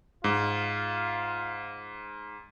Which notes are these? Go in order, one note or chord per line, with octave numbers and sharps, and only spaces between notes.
G#2 F4